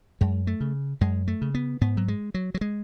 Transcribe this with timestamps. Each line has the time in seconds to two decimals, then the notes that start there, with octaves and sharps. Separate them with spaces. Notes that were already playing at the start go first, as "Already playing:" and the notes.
0.21 F#2 G#3
0.47 A3
0.60 C#3
1.01 F#2 G#3
1.28 A3
1.42 C#3
1.55 B3
1.81 G#2 B3
1.97 F#3
2.08 G#3
2.34 F#3
2.54 F#3
2.61 G#3